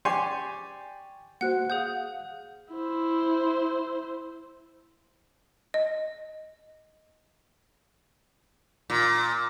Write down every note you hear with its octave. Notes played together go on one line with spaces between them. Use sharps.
G4 D5 G#5 C6 C#6
A#3 F#4 C5 F#5 F#6
G#4 F5 F#5 D#6 G6
E4 C5
D#5
A#2